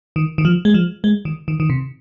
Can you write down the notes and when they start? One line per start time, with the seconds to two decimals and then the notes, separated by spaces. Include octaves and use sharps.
0.16 D#3
0.38 D#3
0.45 F3
0.65 G#3
0.74 F3
1.04 G#3
1.25 D#3
1.48 D#3
1.60 D#3
1.70 C3